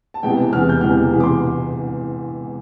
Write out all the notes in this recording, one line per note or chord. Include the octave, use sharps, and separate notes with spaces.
A5
E1 E2 C3 E3 G5
E1 E2 C3 E3 F6
G6
E1 E2 C3 E3 F6
E1 E2 C3 E3
D6
C6